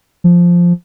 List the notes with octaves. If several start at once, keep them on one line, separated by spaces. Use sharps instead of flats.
F3